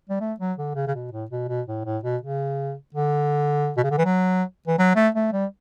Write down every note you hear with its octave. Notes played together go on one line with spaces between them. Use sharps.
G3
A3
F#3
D3
C#3
C#3
B2
A2
B2
B2
A2
A2
B2
C#3
D3
B2
C#3
D3
E3
F#3
E3
F#3
A3
A3
G3